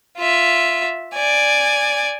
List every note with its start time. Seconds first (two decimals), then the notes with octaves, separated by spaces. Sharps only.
0.18 F4 E5
1.14 D5 G#5